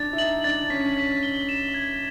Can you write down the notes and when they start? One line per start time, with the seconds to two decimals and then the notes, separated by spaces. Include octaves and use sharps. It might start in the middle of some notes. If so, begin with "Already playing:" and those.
Already playing: D4 A6
0.13 E4
0.18 D#4 F#7
0.44 D4 A6
0.70 C#4 B6
0.97 B6
1.23 G7
1.49 E7
1.74 G#6